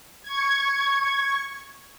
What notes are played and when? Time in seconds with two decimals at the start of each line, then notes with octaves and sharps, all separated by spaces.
0.23 C#6 G#6